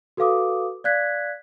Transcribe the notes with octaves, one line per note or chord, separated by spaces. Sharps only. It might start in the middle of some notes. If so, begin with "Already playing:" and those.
F#4 A4 B4 F5 D6 D#6
D5 F5 F#6 G#6 B6